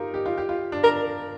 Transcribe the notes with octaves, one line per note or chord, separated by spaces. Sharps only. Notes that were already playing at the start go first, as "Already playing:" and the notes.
Already playing: D#4 F4 G4 A#4
G4
F4
G4
F4
D4
D4 A#4